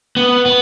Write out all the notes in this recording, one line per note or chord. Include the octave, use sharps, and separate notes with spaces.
B3
B3